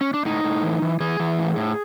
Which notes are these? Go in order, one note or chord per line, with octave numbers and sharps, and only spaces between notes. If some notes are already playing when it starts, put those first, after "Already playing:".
C#4
D4
A2 D#4
A2
E3
E3
E3 G#4
E3
A2
A2